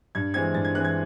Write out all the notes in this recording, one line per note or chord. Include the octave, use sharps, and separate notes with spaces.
G2 G#6
E3 G#3 C4 G#6
G2 A6
G#6
E3 G#3 C4 F#6
G#6